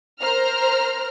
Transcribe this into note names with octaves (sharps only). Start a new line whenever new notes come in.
A#4 C5 A#5 F6